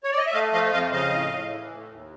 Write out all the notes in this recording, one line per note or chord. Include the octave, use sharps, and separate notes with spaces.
C#5
D5
D#5
E5
A3 D#5 F5
F3 D#5 F5
F2 D#5 F5
C#3 D#5 F5
A2
A2
E3
A2
D#2